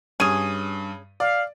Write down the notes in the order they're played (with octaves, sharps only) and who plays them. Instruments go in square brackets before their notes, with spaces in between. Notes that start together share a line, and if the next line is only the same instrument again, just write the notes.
[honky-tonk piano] G2 D#7 [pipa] C#4 G#4
[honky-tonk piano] D5 [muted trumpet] F5